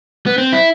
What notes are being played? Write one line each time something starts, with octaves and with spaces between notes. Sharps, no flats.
B3
C4
E4